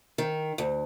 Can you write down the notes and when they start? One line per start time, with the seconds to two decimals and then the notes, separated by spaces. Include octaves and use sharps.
0.18 D#3
0.58 D2